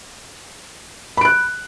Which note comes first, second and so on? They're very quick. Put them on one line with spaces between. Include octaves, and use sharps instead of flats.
B5 D7 F#6